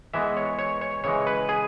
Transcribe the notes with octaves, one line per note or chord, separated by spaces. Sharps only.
E3 G#3 B3 E5
C#5
C#5
C#5
C#3 E3 G#3 C#5
B4
G#4